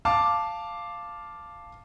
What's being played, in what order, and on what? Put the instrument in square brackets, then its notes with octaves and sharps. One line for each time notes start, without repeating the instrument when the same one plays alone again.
[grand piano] F5 A5 D6